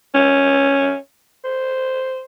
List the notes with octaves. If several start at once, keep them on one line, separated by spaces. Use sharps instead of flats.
C#4
C5